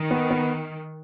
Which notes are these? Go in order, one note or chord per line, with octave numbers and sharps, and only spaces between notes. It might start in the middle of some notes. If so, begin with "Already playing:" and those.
Already playing: D#3
B3
B3